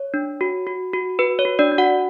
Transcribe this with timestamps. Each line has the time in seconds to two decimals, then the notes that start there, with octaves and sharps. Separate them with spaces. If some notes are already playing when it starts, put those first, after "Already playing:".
Already playing: C#5
0.14 D4
0.41 F#4
0.67 F#4
0.93 F#4
1.19 F#4 B4
1.39 C#5
1.45 F#4
1.59 D4 D5
1.72 D4
1.78 F#4 F#5